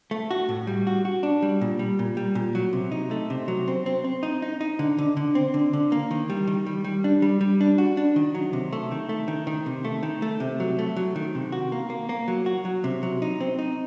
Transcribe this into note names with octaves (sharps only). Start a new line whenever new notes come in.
A3
F#4
A2
G3
F#4
F#4
D4
G3
A#2
G3
A#2
G3
A#2
F#3
C3
D#4
A3
C3
F#3
C4
C4
C4
D#4
D#4
D#4
D3
D3
D3
C4
D3
D3
A#3
D#3
G3
D#3
G3
G3
D4
G3
G3
D4
F#4
D4
D#3
F#3
C3
A3
D#3
A3
D#3
D#3
C3
A3
D#3
A3
C3
F#3
A3
F#3
D#3
C3
F#4
A#3
A#3
A#3
F#3
F#4
F#3
C3
F#3
D#4
C4
D#4